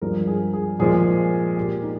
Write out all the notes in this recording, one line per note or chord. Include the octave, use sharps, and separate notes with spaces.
G2 F3 G#3 A#4
G#4
G#4
A#2 F3 G#3 G#4
A#2 G#3 G4
D#4